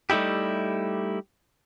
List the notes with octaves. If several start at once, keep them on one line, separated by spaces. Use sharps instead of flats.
G3 A3 D#4 E4 G4